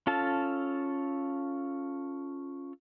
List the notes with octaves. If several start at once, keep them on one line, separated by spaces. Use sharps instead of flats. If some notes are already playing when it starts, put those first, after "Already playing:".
C#4 F4 A4 A5